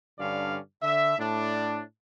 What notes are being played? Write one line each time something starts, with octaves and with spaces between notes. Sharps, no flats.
G2 D3 C#4 D5 F5
D3 E5
A2 D4